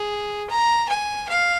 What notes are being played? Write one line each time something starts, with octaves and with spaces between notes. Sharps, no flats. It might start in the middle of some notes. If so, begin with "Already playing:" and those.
Already playing: G#4
A#5
G#5
F5